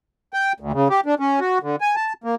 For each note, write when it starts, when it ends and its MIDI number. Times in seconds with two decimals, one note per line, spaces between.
0.33 0.53 79
0.60 0.72 38
0.73 0.88 49
0.90 1.01 67
1.06 1.15 62
1.20 1.40 61
1.40 1.59 66
1.63 1.76 50
1.81 1.96 80
1.96 2.13 81
2.24 2.35 58